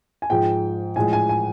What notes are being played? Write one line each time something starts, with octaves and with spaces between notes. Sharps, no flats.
G#5
G#2 F3 G#3 G5
A2 F3 G#3 G#5
G#5
G#5